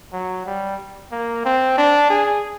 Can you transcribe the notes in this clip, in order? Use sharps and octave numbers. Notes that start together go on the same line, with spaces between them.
F#3
G3
A#3
C4
D4
G#4